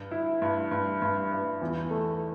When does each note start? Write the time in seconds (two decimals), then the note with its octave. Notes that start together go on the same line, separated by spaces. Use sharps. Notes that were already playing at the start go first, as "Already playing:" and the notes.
Already playing: G2
0.11 E4
0.42 G2
0.71 G2
1.02 G2
1.31 G2
1.61 E2
1.90 A3